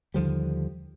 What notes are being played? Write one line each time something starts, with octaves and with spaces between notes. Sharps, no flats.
D#2 D3 F3 G3